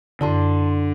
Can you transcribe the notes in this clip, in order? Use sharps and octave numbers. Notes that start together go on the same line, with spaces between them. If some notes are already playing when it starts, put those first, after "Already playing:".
F#2 D3 E4 D5 A5 C6